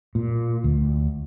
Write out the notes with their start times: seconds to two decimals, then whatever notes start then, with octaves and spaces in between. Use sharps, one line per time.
0.15 A#2
0.64 D2